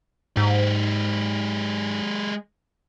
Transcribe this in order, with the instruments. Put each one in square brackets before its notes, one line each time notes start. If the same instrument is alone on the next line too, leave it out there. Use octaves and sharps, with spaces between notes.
[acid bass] G#2 [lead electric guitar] G#3 G4